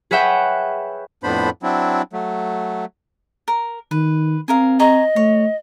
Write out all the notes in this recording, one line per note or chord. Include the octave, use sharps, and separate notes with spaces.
G#4 B4 C#5 E5 F#5 G5
F2 A2 B3 D4 C5 B5
F#3 C4 D4 E4
F#3 A3
A#4
D#3 B4
C4 G#4 A#4 F5
G#4 D#5 A#5 C#6
A3 C#5